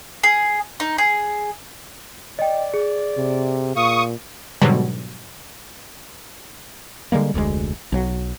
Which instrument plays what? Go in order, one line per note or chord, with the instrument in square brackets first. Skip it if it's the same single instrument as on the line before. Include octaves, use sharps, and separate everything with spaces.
[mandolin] G#4
D#4
G#4
[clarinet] D5 [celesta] D#5 G5
[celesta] G#4
[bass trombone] C3
[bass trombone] A#2 [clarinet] F5 [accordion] C#6 D#6
[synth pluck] G#2 B2 D3 F#3 G3
[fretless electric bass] D3 G3 G#3 A#3
F1 D2 G#2 G#3
B1 F#3